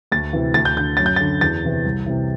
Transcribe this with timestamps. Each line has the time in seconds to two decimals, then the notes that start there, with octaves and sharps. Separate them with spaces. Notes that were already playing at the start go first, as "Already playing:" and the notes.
0.12 D2 A6
0.33 C3 E3
0.54 D2 A6
0.65 G6
0.77 D3 G6
0.97 F#2 A6
1.06 G6
1.16 D3 A6
1.41 E2 A6
1.64 C3 E3
1.85 C2
2.06 C3 E3